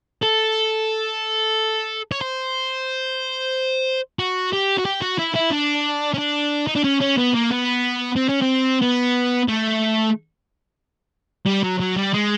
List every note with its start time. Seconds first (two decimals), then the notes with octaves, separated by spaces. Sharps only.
0.23 A4
2.12 C#5
2.21 C5
4.19 F#4
4.53 G4
4.78 F#4
4.85 G4
5.02 F#4
5.19 E4
5.35 E4
5.52 D4
6.14 C#4
6.18 D4
6.67 D#4
6.75 D4
6.84 C#4
7.00 C#4
7.17 B3
7.34 A#3
7.51 B3
8.16 C4
8.29 C#4
8.42 C4
8.82 B3
9.48 A3
11.46 G3
11.63 F#3
11.80 F#3
11.96 G3
12.13 G#3